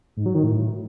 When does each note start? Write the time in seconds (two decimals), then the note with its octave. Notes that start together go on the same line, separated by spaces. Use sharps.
0.17 G#2
0.26 F#3
0.35 D#3
0.44 A2